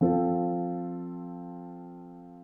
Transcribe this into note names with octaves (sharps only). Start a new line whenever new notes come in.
F3 C4 F4 A4